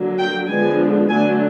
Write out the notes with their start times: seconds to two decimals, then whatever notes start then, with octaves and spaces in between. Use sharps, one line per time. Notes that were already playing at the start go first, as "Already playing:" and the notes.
Already playing: D3 F#3 A#3 D4
0.18 G5
0.48 D3 F3 G#3 B3 D4 G#5
1.09 D3 F#3 A3 D4 G#5